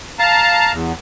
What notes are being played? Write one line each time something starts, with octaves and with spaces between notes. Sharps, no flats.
F5 A5 A#5
E2